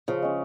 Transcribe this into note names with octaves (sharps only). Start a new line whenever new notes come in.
C#3 F3
G#3 C#4